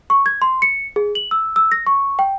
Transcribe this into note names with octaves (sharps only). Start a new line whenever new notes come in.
C#6
G#6
C6
C#7
G#4
F#7
E6
E6
A#6
C#6
G5